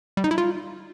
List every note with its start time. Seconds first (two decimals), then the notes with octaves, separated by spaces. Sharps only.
0.17 G3
0.24 D#4
0.31 E4
0.38 F4